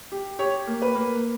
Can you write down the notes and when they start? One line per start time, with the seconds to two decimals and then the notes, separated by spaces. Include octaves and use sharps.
0.12 G4
0.39 G4 C#5
0.67 A#3
0.82 B4
0.95 A#3